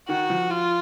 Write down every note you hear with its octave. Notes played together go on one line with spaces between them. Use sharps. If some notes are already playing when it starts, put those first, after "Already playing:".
D#3 F#4
F3
F4